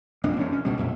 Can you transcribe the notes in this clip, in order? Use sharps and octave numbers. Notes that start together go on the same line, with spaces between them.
B1 F2 A#3 D4
E1 F#2 C#4
C#4
C#2 B2 G3
D#1 F2 A#2 A3